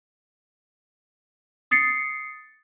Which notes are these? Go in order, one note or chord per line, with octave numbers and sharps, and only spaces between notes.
D#6 A6 C7 C#7